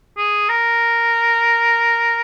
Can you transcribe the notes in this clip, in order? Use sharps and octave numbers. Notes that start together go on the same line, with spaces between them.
G#4
A#4